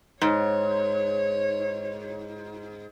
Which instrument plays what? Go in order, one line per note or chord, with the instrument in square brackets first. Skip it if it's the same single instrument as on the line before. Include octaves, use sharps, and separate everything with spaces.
[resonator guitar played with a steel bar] G#2 [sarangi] C#5